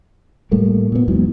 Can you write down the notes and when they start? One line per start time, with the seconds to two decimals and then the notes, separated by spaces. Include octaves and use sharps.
0.51 A2 G3 A3 A#3
0.92 A#2 B3
1.08 E2 G#2 E3 F#3